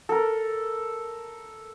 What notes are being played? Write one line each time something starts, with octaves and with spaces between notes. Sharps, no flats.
A4 A#4